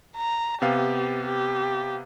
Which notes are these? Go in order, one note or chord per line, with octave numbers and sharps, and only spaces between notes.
A#5
C3 B3 G4 F5
G4